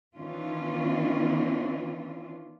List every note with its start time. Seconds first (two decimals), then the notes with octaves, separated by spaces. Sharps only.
0.15 D#3 E3 B3 C#4 D4 F4